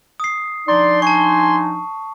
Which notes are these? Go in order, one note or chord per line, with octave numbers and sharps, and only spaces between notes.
D#6 C7
F3 D4 D#4 D5 C6
G#5 A5 C#6